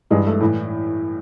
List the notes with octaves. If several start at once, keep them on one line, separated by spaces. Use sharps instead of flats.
G2 E3 G#3
A3
A2 E3